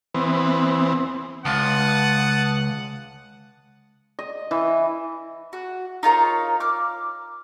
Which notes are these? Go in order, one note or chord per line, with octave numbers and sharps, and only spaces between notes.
E3 B3 C4
C#2 F#5 A5 D#6
D#5
E3
F#4
D#4 F4 A#4 C#5
D6 F6